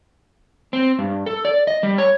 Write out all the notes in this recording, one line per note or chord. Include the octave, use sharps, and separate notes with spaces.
C4
G2
A4
D5
D#5
G3
C#5